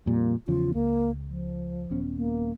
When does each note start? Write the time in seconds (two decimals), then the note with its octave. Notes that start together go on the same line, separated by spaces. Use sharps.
0.06 F2 A#2 G3 A#3
0.48 E2 C#3 F3 F4
0.74 C#2 A#3
1.29 F3
1.90 D#1 B3 C#4
2.16 A#3